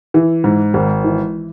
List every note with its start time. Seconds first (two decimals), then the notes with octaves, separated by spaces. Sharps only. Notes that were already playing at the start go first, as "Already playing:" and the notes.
0.14 E3
0.44 G#2
0.74 G#1
1.04 E3